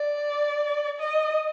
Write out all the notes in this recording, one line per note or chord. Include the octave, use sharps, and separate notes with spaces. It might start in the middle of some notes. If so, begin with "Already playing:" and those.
Already playing: D5
D#5